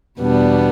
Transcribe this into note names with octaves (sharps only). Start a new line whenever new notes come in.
E2 B2 G3 B3 D4